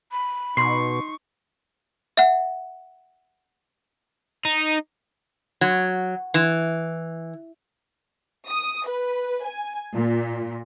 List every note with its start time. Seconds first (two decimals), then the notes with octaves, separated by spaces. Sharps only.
0.11 B5
0.57 B2 D#4 C6 C#6 C7
2.17 E5 F#5
4.45 D#4
5.61 F#3
6.34 E3
8.49 D#6
8.87 B4
9.44 G#5
9.95 A#2